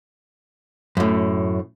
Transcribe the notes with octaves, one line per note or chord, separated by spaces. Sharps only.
F#2 A2